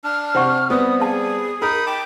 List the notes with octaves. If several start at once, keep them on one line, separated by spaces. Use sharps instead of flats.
D4 F6
C3 C5 F#5 C#6
G3 B3 C4 D#6
G#4 F5 A5
D#4 A#4 B5 D#6
G5 A5 D6